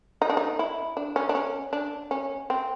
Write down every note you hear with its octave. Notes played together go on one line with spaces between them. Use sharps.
D#4
D4
D#4
E4
D4
C#4
D4
C#4
D4
C#4
C4